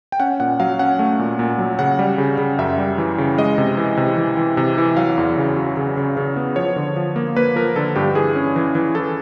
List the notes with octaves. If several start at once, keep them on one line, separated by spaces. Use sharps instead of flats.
G5
C#4 F#5
A#2 F#5
F#3 F5
C#4 F#5
A3
A#2
A#2
F#3
C#3 F#5
G3
C#3
C#3
F#2 E5
G3
E3
C#3
G#3 D#5
C3
E3
C3
E3
E3
C3
E3
F#3 F5
E2
C#3
F#3
C#3
C#3
C#3
B3
F3 C#5
D3
F3
A#3
A#3 B4
F3 A#4
D3 A4
G2 G4
E3 G#4
C#4
E3
E3
E3 A4